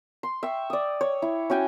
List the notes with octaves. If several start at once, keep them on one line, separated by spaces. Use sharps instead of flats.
C6
E5 G5 C#6
D5 D#6
C#5
E4
C#4 F#4 G5 G#5